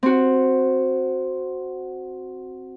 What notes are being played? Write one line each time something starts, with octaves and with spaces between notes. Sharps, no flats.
C4 F#4